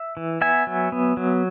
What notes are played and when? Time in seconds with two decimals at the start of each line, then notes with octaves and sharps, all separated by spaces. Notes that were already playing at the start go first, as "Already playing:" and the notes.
Already playing: E5
0.17 E3
0.41 B3 E5 G#5
0.67 F#3
0.92 B3
1.17 F#3